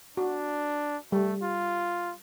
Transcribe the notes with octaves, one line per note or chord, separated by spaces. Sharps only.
D4 F#4
G3 A3
F4